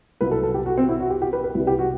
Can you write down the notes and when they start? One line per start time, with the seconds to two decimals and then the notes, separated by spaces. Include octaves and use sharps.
0.21 C2 B2 F#3 B4
0.31 A4
0.43 A4
0.54 G4
0.66 F#4
0.78 C4
0.89 E4
1.00 F#4
1.10 G4
1.22 G4
1.33 B4
1.44 B4
1.55 C2 C3 G3
1.67 G4
1.79 F#4